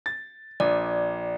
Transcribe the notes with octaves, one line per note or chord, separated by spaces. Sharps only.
A6
A#1 D5